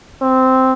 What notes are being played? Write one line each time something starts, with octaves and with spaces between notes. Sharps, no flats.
C4